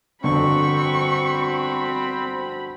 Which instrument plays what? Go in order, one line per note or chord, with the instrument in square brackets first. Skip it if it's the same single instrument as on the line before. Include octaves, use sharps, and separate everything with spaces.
[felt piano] G1 F2 D3 [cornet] C4 [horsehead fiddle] F#4 B5 [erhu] C#6